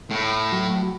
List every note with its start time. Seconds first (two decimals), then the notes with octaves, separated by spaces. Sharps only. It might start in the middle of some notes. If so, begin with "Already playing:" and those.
0.11 A2
0.52 F#3